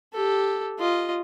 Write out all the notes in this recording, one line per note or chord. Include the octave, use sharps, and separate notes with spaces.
G4 A4
F4 D#5